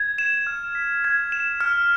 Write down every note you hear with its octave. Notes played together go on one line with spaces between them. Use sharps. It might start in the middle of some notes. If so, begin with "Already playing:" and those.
Already playing: G#6
E7
F6
B6
G#6
E7
F6